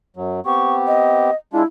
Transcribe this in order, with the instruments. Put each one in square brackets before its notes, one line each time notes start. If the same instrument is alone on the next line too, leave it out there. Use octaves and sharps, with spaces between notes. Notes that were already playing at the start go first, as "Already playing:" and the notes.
[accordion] F#2 F#3
[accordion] B3 C4 G4 [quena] C#6
[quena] D#5
[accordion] G#3 D4 F4 [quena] E4